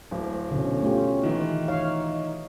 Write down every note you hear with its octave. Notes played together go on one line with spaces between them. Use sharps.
D1 D2
B2 D3 C#4
A3 F4 G4
D#3 E3
D#4 C#5 F5